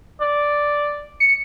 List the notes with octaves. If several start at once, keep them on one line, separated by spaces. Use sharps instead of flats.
D5
C#7